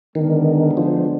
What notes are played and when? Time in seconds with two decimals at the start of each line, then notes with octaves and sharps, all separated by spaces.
0.15 D3 D#3 G#3 B3 D4
0.77 F3